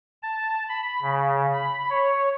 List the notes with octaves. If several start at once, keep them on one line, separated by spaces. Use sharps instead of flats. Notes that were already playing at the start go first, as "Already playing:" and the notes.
A5
B5
C#3
B5
C#5